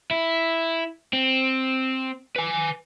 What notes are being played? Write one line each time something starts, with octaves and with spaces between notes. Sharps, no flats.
E4
C4
B4 G#5